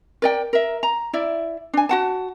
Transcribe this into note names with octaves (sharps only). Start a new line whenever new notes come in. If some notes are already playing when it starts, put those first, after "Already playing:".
A#4 D5 G5
A#4 E5
A#5
E4 D5 E5
D4 G#5
F#4 F#5 A5